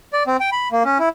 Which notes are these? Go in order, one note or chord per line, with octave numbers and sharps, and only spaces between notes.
D5
C4
G5
B5
A#3
C#4
E4